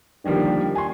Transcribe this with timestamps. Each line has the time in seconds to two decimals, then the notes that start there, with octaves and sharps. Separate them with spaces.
0.24 D3 D#3 F3 G3 A#3
0.75 G#5 C6